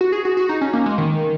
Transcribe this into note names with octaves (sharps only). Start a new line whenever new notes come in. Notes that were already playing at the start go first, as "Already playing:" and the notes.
F#4
G#4
F#4
F#4
D#4
C#4
A#3
G#3
D#3